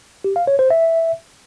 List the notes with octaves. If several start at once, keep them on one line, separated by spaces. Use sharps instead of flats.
G4
F5
C#5
C5
E5